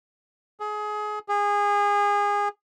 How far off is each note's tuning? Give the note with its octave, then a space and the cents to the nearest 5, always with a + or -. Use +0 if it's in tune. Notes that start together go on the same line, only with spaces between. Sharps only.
G#4 +25
G#4 -25